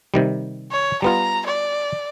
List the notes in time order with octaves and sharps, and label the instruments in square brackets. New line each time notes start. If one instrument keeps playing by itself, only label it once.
[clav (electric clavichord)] C3 D#3 G3
[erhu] C#5
[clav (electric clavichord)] G3 B3 F4 [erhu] A#5
[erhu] D5